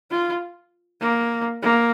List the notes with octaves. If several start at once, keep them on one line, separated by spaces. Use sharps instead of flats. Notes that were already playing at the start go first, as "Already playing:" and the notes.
F4
A#3
A#3